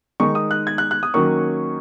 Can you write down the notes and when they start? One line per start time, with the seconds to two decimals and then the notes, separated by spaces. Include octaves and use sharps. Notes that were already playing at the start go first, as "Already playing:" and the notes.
0.20 D#3 G#3 D#4 C#6
0.35 D#6
0.51 F#6
0.67 G#6
0.78 F#6
0.91 F#6
1.03 D#6
1.14 D#3 F#3 A#3 C#4 C#6